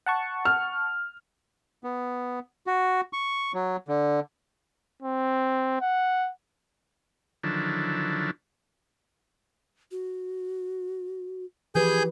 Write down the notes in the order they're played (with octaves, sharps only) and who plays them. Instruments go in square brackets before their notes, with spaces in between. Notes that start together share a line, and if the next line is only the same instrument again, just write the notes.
[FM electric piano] F#5 A5 C#6
[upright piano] F6
[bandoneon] B3
F#4
C#6
F#3
D3
[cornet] C4
F#5
[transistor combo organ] D3 D#3 F3 F#3 D4 E4
[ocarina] F#4
[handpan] E3 F3 B4 [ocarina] G4 [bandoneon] G#4 G#5 G6